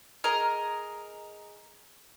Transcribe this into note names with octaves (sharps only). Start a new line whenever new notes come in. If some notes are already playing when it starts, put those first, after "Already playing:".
G#4 A#4 D#5 A#5